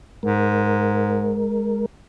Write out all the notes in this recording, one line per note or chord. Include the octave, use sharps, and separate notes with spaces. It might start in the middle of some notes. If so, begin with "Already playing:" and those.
G#2 G#3 A#4